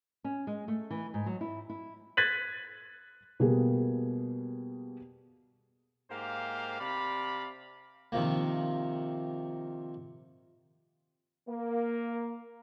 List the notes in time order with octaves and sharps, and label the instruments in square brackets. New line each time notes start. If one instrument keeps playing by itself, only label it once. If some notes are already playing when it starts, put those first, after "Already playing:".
[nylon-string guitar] C#4
G#3
A3
E3
G#2
F#3
E4
E4
[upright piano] F#6 G#6 A6 B6 D#7 F#7
[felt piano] B2 G3 A#3 G#4
[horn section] G#2 A#3 G4 C5 F5
C3 D5 F5 B5
[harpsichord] C3 D#3 F3 A#3
[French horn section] A#3